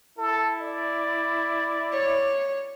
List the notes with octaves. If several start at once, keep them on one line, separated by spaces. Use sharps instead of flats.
E4 A4
D5
C#5